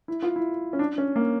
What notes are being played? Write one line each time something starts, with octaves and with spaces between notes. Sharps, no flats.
E4
F4
E4
C#4
D4
C#4
A#3